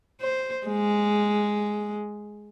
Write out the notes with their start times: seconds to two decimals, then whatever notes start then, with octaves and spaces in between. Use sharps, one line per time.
0.21 C5
0.67 G#3